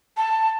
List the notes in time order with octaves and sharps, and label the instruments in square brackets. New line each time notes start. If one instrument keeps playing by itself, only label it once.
[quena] A5